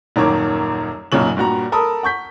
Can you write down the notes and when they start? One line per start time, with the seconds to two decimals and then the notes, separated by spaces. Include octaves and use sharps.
0.16 D#1 F#2 D#3 A#3 C#5 D6
1.12 B1 F#2 A#2 C#3 F#7
1.37 G2 A#2 F#4 A#5
1.72 A4 A#4 A5 B5 D#6
2.03 F#5 C#6 G6 B6